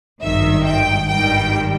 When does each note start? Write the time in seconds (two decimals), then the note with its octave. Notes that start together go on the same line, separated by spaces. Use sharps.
0.21 G#1 G2 D#3 E5
0.65 G5
1.09 G#1 G2 D#3 G3 G5